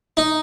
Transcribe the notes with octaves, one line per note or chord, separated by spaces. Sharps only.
D#4